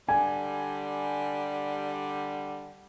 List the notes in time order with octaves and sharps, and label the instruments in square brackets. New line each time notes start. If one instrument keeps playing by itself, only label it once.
[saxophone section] D3 G3 [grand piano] G#5